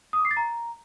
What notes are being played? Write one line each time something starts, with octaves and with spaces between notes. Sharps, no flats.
D#6
D6
C7
A6
A#5